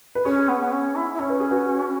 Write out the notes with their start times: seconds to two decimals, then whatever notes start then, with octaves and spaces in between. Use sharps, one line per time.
0.15 B4
0.25 C#4 G#4 C#5
0.48 B3
0.60 B3
0.72 C#4
0.96 E4
1.14 E4
1.20 C#4 C#5
1.30 B4
1.40 G#4
1.51 F#4 B4